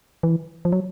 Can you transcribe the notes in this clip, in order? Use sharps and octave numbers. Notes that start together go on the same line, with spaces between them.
E3
F3
F#3